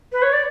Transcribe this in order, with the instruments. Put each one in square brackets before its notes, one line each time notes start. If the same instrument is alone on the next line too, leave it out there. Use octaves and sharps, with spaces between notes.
[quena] B4
C#5
D5